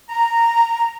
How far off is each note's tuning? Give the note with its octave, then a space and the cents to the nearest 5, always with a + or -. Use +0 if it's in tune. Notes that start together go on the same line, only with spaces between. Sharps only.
A#5 -15